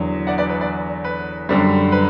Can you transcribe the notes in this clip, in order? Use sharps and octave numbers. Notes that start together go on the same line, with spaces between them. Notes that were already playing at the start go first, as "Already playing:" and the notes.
Already playing: E2 D3 F#3
D5 F#5
B4 D5
B4
B4 D5
B4
F#2 D3 G3
B4